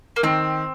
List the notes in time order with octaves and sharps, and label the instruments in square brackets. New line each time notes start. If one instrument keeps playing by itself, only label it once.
[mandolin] A#3
[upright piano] D#3 [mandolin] C4